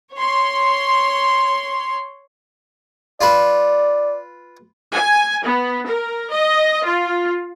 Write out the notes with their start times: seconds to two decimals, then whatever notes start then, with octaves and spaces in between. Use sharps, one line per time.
0.13 C#5 C6
3.21 F4 B4 D5
4.94 G#5
5.46 B3
5.87 A#4
6.32 D#5
6.85 F4